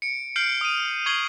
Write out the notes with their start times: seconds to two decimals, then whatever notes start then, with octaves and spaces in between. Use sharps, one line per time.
0.02 C#7 D7
0.36 F6 G6 C7 D7 F#7
0.61 D#6 D#7
1.06 C#6 G#6 C7 F#7 G7